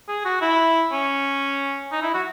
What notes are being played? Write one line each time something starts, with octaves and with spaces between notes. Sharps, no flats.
G#4
F#4
E4
C#4
D#4
E4
F#4